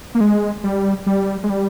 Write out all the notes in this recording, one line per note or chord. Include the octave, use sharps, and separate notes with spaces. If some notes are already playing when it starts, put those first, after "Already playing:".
A#3
G#3
G3
G3
G#3
G3